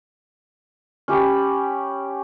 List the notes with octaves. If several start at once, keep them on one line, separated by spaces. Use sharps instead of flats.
C#4 G4 B5